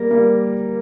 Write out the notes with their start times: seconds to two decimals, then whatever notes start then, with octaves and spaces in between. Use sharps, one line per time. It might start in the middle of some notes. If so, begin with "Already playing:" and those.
Already playing: G3 A#3 A#4
0.11 G3 A#3